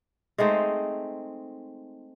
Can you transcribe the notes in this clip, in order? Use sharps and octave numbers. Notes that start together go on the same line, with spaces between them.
G#3 A3 C4 D#4